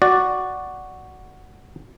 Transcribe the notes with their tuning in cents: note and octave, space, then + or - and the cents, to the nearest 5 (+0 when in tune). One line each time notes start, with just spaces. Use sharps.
F#4 +0 D5 +0